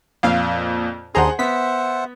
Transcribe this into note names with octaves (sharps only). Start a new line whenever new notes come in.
F2 A#2 F5
D#2 D4 G#4 C5 F#5 A#5 C6 D#6
B3 C5 E5 F#5 B6